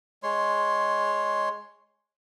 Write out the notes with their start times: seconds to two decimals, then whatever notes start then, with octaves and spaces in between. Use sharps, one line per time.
0.23 G#3 C#5 C6